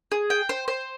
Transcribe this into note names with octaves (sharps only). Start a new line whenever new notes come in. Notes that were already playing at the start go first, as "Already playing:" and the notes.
G#4
G5
C5
C5